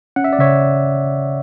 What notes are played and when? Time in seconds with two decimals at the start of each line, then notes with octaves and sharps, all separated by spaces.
0.16 C#4 F#5
0.24 E5
0.33 D5
0.39 C#3 C#5 E5